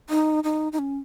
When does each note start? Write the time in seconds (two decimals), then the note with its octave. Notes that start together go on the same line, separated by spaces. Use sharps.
0.10 D#4
0.44 D#4
0.72 D#4
0.79 C#4